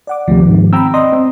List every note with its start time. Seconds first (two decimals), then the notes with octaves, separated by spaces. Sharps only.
0.07 D5 F#5 D6
0.28 D2 C3 D#3 F3
0.47 G#2
0.73 C4 G5 A#5 B5 E6
0.94 D5 D#5 A#5 C6 D#6
1.13 C4